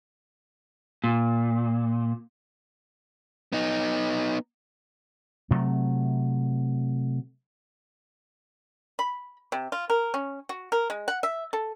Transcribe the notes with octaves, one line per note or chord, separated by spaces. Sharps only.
A#2
B3 D#4
C3 F#3 A3
B5
C3
F4
A#4
C#4
F#4
A#4
G#3
F#5
E5
A4